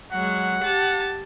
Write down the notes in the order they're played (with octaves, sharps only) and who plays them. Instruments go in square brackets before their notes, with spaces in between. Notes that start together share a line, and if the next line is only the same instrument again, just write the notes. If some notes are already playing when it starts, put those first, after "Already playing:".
[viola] F#3 G#3 [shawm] F#5
[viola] G4 A5